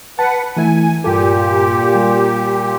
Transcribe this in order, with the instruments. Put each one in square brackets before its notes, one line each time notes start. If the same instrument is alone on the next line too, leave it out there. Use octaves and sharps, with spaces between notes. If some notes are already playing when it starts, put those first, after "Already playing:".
[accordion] B4 F#5 [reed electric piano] A5
[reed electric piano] E3 A3 E4 [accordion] G#5
[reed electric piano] G2 F4 A4 [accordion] A#2 G4
[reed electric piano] G3